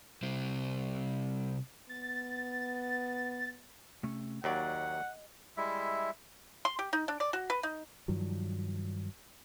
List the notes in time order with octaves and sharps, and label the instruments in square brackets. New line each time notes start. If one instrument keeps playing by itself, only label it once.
[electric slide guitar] C3 G3 C4 G4 C5
[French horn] B3 [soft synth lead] A6
[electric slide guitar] C3 A3 C#4
[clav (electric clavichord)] D#2 F#3 D5 [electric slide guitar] D#5 [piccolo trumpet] F#5
[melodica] G3 G#3 E4 E5
[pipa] C6
G4
D#4
D4
D5
F#4
B4
D#4
[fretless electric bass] G2 D#3 F3 F#3